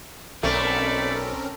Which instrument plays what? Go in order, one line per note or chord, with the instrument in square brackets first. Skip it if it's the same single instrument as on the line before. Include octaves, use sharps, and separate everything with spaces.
[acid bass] B1 [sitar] A3 [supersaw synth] C4 C#4 A#4 [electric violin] D5 B5